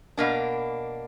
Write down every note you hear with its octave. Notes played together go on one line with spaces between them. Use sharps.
B2 A#3 D4